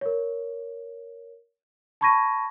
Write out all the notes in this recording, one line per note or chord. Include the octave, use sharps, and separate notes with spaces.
A#4 C#5
A5 B5 C#6 G#6 A#6 D#7